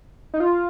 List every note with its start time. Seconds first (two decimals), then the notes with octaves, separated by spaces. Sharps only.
0.34 D#4
0.40 F4